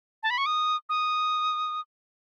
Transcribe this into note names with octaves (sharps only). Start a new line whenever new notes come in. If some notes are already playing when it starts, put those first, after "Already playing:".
A5
B5
C#6
D#6
D#6